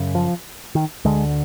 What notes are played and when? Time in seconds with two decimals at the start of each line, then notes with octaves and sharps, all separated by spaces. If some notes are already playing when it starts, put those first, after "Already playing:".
Already playing: F#2 C#3
0.15 F3
0.75 D#3
1.05 D2 D3 G#3